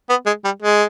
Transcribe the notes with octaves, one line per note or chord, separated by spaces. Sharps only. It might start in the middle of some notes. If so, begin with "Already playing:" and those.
B3
G#3
G3
G#3